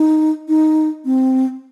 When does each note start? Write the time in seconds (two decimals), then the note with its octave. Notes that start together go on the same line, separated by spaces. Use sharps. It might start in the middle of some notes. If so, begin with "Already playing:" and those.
Already playing: D#4
0.48 D#4
1.05 C4